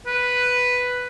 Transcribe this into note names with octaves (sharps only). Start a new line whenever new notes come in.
B4